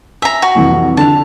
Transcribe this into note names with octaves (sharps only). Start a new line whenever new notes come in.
E5 G#5 A#5
F#4
C2 F2 E3
D3 A5 F7